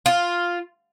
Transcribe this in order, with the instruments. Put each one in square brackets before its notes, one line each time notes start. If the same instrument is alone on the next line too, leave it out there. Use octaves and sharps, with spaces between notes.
[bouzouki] F4